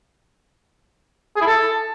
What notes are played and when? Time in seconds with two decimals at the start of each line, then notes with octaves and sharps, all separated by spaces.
1.36 G#4
1.41 E4
1.47 A4